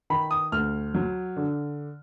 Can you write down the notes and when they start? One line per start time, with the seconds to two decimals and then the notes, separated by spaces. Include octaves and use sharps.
0.10 D#3 B5
0.31 D#6
0.52 D2 F6
0.95 F#3
1.36 D3